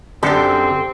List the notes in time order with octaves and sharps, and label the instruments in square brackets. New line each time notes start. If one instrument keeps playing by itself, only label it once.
[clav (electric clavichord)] F#2 D3 A4 [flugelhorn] C4 [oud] G4 D5